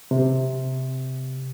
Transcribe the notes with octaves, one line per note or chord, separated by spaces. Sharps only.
C3